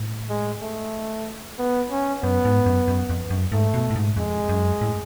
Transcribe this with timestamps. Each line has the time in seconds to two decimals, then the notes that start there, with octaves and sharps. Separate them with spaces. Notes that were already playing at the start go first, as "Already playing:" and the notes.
Already playing: A2
0.29 G#3
0.62 A3
1.58 B3
1.91 C#4
2.23 F#2 B3
2.45 G#2
2.66 F#2
2.88 F#2
3.09 F2
3.30 F#2
3.52 G#2 A3
3.74 B2
3.90 A2
3.96 G#2
4.17 F2 G#3
4.49 F#2
4.81 A2